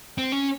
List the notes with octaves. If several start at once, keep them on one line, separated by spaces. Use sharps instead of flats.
C4
C#4